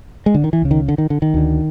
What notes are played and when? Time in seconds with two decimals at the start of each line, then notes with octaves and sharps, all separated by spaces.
0.26 G#3
0.35 D3
0.44 D#3
0.53 E3
0.62 C#2 C#3
0.71 D#3
0.88 D3
0.98 D#3
1.10 D3
1.22 D#3
1.34 D2 D3